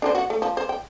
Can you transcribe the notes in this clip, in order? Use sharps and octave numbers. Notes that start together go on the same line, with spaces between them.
D4 A#4 C5
F#4 F#5
A3
F3
C5
G5